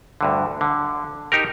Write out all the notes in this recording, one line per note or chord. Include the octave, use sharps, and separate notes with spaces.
D2 G2 D3
D3
D#4 G4 A#4